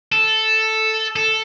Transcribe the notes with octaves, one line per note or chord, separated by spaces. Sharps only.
A4
A4